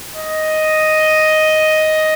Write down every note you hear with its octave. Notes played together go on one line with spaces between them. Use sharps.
D#5